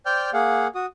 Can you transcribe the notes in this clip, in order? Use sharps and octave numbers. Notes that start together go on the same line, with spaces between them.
C5 D5 G5 F6 G6
A#3 G#4 F5 F#5
F#4 D#6